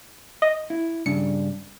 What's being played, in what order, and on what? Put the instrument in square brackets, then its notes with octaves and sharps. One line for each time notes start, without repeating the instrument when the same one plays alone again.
[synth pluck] D#5
[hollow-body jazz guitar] E4
[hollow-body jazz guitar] G2 C#3 D4 [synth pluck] C#7